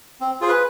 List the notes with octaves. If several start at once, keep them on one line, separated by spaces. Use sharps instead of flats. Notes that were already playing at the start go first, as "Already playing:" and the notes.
C4
F4 G#4 C5
B4